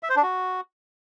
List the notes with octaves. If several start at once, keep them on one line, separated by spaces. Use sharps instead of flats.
E5
C5
D4
F#4